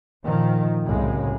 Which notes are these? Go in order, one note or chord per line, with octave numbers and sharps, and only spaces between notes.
A#2 D#3 F3
C2 F#2 A2 C#3 G#3